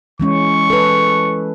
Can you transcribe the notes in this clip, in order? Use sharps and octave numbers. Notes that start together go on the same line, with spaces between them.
E3 G#3 C#4 C#6
A4 B4